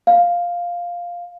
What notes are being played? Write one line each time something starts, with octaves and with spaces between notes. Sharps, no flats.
F5